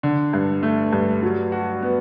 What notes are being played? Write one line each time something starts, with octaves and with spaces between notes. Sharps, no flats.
D3
G2
A3
G2
F#3
F#4
B3